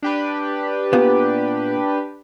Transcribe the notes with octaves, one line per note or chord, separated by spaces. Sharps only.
D4 G4 B4
A#2 B3